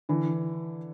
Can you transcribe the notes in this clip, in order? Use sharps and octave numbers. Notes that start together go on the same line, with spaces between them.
D3 E3